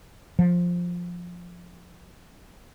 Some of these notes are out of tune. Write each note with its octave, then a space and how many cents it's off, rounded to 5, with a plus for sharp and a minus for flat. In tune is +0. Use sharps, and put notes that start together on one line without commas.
F3 +10